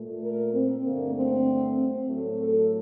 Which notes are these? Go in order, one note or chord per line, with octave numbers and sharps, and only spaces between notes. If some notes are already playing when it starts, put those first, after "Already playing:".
Already playing: A#2 A3
A#4
C4
G2 D3 A3 A#3
C4
C4
A2 F#3 A3
A4